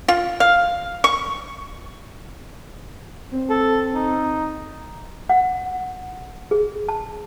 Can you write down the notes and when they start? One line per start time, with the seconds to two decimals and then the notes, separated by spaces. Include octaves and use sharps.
0.08 F4
0.40 F5
1.04 C#6
3.32 C4
3.50 A4
3.95 D#4
5.29 F#5
6.51 G#4
6.88 A5